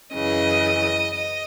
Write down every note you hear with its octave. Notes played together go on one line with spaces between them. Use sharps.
F#2 C#3 E3 D#5
D#5